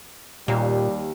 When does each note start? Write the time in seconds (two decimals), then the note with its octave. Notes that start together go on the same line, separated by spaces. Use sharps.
0.48 D#2 A#2 G3